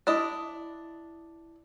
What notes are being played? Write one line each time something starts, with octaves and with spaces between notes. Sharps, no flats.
D4 E4 D#5